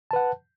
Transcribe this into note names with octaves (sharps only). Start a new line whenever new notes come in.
B4 F#5 A5